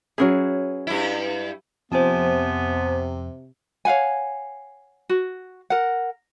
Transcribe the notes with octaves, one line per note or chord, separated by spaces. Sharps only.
F#3 C#4 G#4 B4 E5
G2 E4
F2 C3 B3 C5 G#5 A5
C#5 F5 F#5 G#5
F#4
A#4 F#5